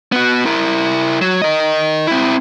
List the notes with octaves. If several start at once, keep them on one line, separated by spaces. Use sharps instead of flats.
B3 F#4
E4 A#4
F#3
A#4 D#5
C4 E4